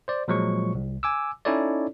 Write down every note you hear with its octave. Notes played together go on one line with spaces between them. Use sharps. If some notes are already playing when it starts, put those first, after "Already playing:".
C5 D5
A#2 F3 F#3 G#3 C#6
C2
G#5 D6 E6
C#4 D#4 E4 A4 C#5 D5